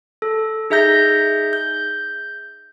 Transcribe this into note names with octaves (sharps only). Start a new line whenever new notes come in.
A4
D#4 G#4 E5 A#5 G6 A#6
G6